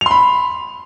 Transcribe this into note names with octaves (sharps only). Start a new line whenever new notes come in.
B5 C6 F7